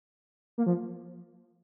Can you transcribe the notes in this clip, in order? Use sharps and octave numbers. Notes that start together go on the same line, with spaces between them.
A#3
F3